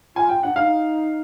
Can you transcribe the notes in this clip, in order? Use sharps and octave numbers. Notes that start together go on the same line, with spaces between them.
F4 G#5
G5
D4 F#5
D#4 F5